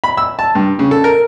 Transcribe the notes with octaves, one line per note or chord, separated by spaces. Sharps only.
B5
E6
A5
G2
C#3
A4
A#4